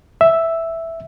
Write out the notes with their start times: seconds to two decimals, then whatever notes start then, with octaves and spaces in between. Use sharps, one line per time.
0.21 E5